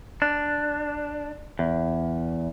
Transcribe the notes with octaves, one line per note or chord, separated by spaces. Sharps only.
D4
E2